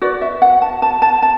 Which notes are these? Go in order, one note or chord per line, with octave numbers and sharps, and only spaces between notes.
F#4 B4 D5
E5
F#5
A5
A5
A5
A5